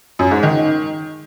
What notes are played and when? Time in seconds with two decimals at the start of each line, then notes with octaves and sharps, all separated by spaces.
0.19 F#2
0.31 G#2
0.43 D#3